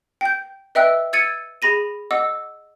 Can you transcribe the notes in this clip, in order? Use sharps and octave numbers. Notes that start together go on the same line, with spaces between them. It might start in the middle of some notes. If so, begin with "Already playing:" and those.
G5 G6
B4 D#5 E5 G5 E6 F#6
E6 G#6 A6 C#7 D#7
G#4 B5 A#6 D#7
D#5 F#5 D6 E6